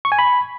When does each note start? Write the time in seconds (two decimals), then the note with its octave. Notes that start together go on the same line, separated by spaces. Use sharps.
0.05 C#6
0.12 G#5
0.19 B5